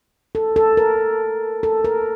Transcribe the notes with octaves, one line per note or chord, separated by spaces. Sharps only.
A4
A4
A#4
A4
A#4